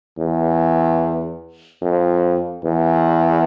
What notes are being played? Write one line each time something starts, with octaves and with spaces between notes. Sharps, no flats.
E2
F2
E2